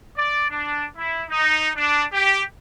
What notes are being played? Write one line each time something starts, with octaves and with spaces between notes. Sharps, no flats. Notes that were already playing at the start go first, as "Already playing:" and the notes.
D5
D4
E4
D#4
D4
G4